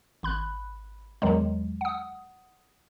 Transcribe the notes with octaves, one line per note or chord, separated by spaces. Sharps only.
G#1 B5 F#6
E2 D#3 F#3 G#3
F#5 D#6